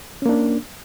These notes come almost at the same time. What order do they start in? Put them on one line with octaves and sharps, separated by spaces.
C#4 A#3 D4